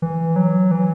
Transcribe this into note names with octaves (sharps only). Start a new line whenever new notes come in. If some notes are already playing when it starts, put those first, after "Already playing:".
E3
F#3
E3